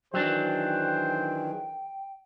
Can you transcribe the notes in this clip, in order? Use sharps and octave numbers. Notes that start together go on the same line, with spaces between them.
D#3 E3 F#3 D4 G#4 C5 G5